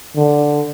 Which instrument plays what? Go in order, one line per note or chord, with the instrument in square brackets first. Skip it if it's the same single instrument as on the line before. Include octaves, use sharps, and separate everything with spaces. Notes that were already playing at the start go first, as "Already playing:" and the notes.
[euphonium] D3